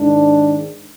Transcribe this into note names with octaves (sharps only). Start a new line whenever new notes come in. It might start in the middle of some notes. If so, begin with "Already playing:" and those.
Already playing: G#2 D#3 D4